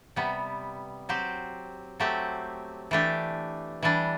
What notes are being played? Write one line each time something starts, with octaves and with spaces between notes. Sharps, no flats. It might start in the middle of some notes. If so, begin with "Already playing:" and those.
C3 G3 B3
F#3 C4 G4
F#3 A3 C4 G4
E3 A3 D4 G4
E3 G3 D4